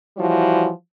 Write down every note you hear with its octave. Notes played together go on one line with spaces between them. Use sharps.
E3 F3 G3 E4 F#4 C#5